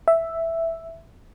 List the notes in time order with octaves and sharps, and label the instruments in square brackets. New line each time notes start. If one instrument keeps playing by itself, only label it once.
[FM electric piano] E5